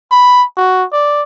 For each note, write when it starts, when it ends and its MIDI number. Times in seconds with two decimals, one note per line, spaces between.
0.11 0.45 83
0.57 0.85 66
0.93 1.23 74